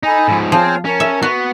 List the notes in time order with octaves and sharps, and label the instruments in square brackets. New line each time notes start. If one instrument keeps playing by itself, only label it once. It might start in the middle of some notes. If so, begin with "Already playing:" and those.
[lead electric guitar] D#4 [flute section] A4 G#5 B5
[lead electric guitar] G#2 F3
[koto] F3 [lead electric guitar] C4 C5 [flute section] F4 G#4 C#5
[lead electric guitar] C#4 [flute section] A#4 A5
[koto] E5
[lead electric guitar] B3 [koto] F#4